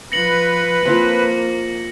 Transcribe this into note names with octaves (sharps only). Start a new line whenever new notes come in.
F3 B4 A#6 C#7 F#7
F3 A#3 C4